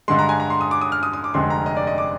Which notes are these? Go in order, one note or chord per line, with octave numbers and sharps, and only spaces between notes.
G2 D3 G#3 C6
A#5
G#5
A#5
C6
D#6
D6
D#6
F6
D#6
D#6
D6
F1 F2 D3 G#3 C6
A#5
D#5
D5
D#5
D6